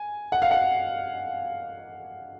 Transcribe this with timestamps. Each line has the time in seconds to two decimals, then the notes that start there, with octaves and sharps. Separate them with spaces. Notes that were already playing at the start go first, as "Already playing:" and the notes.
Already playing: G#5
0.32 F#5
0.42 F5
0.51 F#5